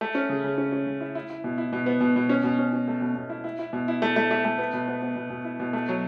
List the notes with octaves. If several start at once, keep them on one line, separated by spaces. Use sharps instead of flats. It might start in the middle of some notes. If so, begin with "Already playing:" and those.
A3
C#4
C#3
C#3
C#4
C#4
C#3
E4
E4
E4
B2
E4
B2
B3
B2
B2
C#4
B2
C#4
C#4
A3
B2
B2
E4
E4
E4
B2
E4
A3
A3
A3
A3
B3
B2
B3
B3
B2
B2
E4
B2
A3
F#3